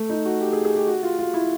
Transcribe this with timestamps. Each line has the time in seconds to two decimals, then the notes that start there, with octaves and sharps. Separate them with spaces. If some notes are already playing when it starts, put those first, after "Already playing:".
Already playing: A3
0.10 D#4
0.25 F#4
0.41 G4
0.53 G#4
0.65 G#4
0.76 G4
0.87 F#4
1.03 F4
1.19 F4
1.34 E4